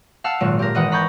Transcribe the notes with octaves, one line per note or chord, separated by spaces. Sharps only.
F5 F#5 A5 E6
G#1 A#2 F#3
G4 A#4
G#1 E3 D#4 F#5 D#6 D7
A#5 B5 C#6 G6 A6